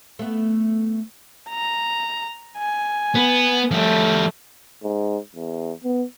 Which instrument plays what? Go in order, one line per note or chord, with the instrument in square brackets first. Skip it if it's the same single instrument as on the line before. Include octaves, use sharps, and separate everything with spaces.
[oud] A3 B3
[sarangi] A#5
G#5
[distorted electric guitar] B3
[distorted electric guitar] F3 G3 [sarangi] A3
[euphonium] G#2
E2
B3